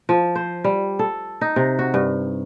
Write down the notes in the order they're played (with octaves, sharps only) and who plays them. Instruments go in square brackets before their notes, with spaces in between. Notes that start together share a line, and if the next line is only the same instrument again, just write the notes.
[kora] F3
C5
G3
A4
D#4
C3
F#4
G2